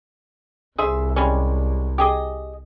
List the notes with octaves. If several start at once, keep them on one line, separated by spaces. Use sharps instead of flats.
C2 G#4 C5 E5
G3 G#3 C#4
G4 G#4 D#5